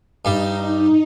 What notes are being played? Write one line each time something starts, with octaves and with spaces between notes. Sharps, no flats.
G2 G3 D#4